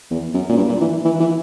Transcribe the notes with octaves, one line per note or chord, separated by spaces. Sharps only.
E2
F#2
A#2
G2
A#2
E3
E3
E3